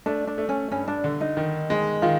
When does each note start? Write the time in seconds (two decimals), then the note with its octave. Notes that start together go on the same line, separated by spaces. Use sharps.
0.06 A3 D4
0.27 D4
0.38 A3
0.49 C#4
0.71 G2 C#4
0.88 D4
1.04 D3
1.21 D#4
1.37 D#3
1.70 G#3
2.02 D#3 F4